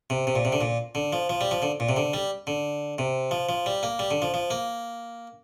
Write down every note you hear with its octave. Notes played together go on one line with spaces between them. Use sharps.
C3
C3
A#2
C3
D3
A#2
D3
F3
F3
G3
F3
D3
A#2
C3
D3
G3
D3
C3
F3
F3
G3
A#3
G3
D3
F3
F3
A#3